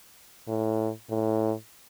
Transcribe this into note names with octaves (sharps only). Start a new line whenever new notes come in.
A2
A2